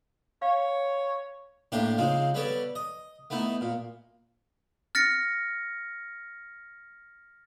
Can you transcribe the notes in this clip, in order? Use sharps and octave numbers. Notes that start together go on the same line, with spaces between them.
C#5 F5
A2 A#3 D4 G4 C6
C#3 F3 G#3 C4 D#4
G3 B3 A4 C#5 D5
D#5
A3 B3 D#4 E4
A#2
F6 A6 A#6 C#7